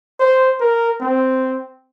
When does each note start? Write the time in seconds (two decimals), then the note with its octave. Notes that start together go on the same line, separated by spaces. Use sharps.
0.20 C5
0.60 A#4
1.01 C4